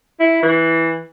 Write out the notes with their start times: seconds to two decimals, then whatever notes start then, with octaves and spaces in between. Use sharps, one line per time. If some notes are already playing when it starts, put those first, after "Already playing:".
0.20 E4
0.42 E3